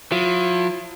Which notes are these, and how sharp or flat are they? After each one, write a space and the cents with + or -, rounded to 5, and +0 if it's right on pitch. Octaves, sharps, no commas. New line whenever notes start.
F3 +45 E4 +45